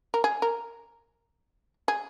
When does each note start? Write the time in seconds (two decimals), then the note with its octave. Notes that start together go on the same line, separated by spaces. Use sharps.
0.14 A#4
0.24 G#4
0.42 A#4
1.88 G#4